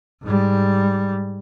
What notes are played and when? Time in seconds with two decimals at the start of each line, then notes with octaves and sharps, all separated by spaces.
0.23 G#2 G3